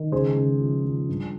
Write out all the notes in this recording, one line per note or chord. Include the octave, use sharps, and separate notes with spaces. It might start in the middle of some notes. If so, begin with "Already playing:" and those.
Already playing: D#3
C#2 G#4 C5
C#2
F3
F3
G2